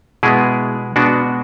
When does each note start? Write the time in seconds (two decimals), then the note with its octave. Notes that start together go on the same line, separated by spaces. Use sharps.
0.23 B2 G#3 B3 E4 G#4
0.96 B2 G#3 B3 D4 F#4